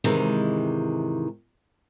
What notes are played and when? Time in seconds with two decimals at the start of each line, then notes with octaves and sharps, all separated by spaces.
0.04 G#2 C3 D#3 E3 G#3